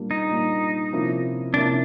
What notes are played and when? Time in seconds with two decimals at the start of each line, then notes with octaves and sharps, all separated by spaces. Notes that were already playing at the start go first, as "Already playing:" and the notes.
Already playing: A#2 G3 A#3 D4
0.11 D#4
0.31 A#2 G3 A#3 D4
0.93 C3 F3 A#3 C#4 E4
1.54 C3 F3 A#3 C#4 D4 E4